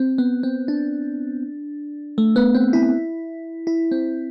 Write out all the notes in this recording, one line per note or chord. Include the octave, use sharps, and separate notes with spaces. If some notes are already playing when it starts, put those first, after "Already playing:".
Already playing: C4
B3
C4
D4
A3
B3
C4
E4
E4
C4